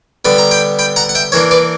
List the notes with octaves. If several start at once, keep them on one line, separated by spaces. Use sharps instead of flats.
D3 G3 B3 D4 B5
A#5
G5 B5
G5 B5
F#5 A#5
F#5
E5 G5
E3 A#3 D4 C#5 E5
B4 D5